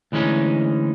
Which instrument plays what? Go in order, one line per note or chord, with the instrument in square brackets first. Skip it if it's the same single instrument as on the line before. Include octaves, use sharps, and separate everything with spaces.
[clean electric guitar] D2 E3 G#3 C#4 D#4